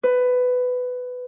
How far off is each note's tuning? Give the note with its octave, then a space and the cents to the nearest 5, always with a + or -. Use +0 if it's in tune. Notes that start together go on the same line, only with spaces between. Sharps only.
B4 +15